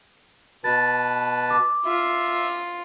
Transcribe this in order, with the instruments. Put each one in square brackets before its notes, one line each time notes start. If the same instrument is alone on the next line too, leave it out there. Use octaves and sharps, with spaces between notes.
[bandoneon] B2 B4 A5 [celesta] A6
[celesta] D6
[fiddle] F4 [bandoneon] E5